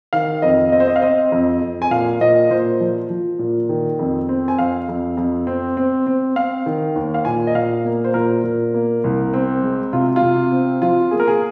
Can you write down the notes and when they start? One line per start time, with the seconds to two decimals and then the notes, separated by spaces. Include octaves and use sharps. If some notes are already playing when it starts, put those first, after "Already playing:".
0.13 D#3 F5
0.42 F2 D#5
0.72 C4 D#5
0.80 C5
0.88 D#5
0.96 F5
1.02 C4 D#5
1.32 F2
1.61 F2
1.82 G#5
1.91 A#2 F5
2.21 A#2 D#5
2.50 A#2 C5
2.80 F3
3.10 F3
3.39 A#2
3.69 D#3
3.99 F2
4.29 C4
4.48 G#5
4.58 F2 F5
4.88 F2
5.17 F2
5.47 C4
5.77 C4
6.06 C4
6.36 C4 F5
6.66 D#3
6.96 D#2
7.14 F5
7.25 A#2 G#5
7.47 D#5
7.55 A#2 F5
7.85 A#3
8.05 C5
8.14 A#2 A#4
8.44 A#2
8.74 A#3
9.04 C2
9.33 C4
9.63 G#3
9.93 C3 F4
10.16 F4
10.22 C3
10.52 C4
10.82 F3 F4
11.11 A#3 G#4
11.20 A#4
11.28 G#4